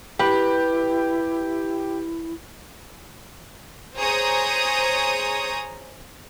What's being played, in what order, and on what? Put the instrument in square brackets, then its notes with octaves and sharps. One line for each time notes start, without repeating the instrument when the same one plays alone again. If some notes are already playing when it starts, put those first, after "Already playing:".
[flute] E4 [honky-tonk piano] G4 [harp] B4
[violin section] G#4 C5 C#5 A#5 D#6